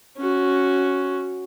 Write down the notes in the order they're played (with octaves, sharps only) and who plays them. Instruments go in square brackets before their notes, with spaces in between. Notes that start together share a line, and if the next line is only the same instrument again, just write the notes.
[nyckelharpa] C#4 F#4